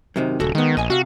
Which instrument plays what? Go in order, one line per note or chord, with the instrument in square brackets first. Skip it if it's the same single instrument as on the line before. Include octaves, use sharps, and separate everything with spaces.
[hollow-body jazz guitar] F#2 C3 D#3
[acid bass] D#1 [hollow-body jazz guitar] C#3 F#4 A4
[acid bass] D#3 [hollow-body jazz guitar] G#3 B3
[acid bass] A#1 [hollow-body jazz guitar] D#5 G#5
[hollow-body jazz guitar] C3 F5 [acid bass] F#4